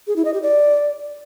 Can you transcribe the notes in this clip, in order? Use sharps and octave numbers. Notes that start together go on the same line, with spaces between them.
G#4
E4
D#5
G4
D5